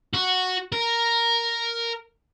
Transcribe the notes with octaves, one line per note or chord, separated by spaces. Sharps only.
F#4
A#4